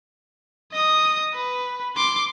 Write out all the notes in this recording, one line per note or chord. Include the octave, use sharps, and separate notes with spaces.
D#5 D#6
B4
C6 D6